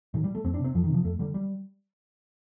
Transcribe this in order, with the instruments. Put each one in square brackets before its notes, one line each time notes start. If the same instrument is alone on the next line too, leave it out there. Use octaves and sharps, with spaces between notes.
[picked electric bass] A2 D#3
G3
A3
F2 C4
D4
C3
C4
F2 F3
D#3
C3 F3
F2 A3
D3 G3
G3